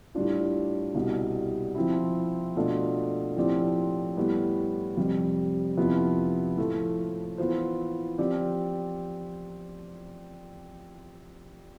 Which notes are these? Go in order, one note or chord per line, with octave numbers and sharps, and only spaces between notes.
A2 G3 D4 F4
C2 B2 G3
F3 C4 E4
B2 A3 D4 F4 A4
A2 F3 C4 G4 D5
A2 G3 B3
F2 C3 G3
F2 C3 F3 B3 E4
A2 F3 A3
E3 B3 F4 C5
F3 C4 G4 D5